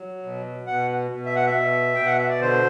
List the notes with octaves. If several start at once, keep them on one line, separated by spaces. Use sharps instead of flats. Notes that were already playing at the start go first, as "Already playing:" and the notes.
Already playing: F#3
B2
B2 F#5
B2
E5
F#5
E5
B2
B2 G5
F#5
E5
D5
D3 C5